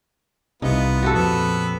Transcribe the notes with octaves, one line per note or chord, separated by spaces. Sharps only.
C2 C3 B3 D#4 F4
F#4 G4 A4
A#1 F2 B3 E6